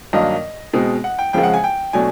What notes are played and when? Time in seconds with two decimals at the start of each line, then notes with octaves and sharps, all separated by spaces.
0.13 G2 D#3 F#3 A#3 D#5
0.73 B2 G#3 C4
1.04 F#5
1.19 G5
1.33 F2 C#3 F3 G#3 G5
1.43 F#5
1.54 G#5
1.64 G5
1.93 B2 F#3 A3 D4 G#5